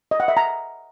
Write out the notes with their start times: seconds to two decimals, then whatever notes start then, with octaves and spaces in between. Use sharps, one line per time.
0.11 D#5
0.20 F#5
0.28 E5
0.37 A#5